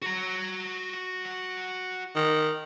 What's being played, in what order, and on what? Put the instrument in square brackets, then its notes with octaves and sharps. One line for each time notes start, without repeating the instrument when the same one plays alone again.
[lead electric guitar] F#4 A#5
[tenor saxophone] D#3